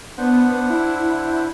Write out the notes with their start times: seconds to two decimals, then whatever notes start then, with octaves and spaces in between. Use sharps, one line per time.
0.18 B3 D4 C5 F#5
0.70 E4